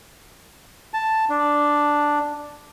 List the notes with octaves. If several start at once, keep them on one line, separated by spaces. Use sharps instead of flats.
A5
D4